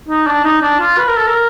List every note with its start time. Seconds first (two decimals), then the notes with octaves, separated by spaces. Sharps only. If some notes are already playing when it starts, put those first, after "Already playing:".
0.09 D#4
0.27 D4
0.44 D#4
0.62 D4
0.79 F4
0.98 B4
1.08 A#4
1.17 A4
1.28 A#4